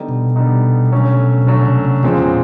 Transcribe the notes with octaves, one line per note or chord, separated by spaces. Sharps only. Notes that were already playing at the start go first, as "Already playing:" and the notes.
Already playing: D3 G3 B3 D#4
B2
D3 G3 B3 D#4
D3 F#3 A3 C#4
C3
B2 D3 F#3 A3 C#4
C3
C3
E2 A#2 C#3 F3 G#3 C4